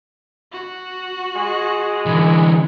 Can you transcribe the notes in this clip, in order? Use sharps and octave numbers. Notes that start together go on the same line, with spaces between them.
F#4
G#3
D3 E3